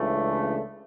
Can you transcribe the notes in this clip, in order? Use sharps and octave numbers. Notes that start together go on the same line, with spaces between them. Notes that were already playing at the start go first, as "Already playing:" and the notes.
Already playing: C#2 C#3 E3 A3 D4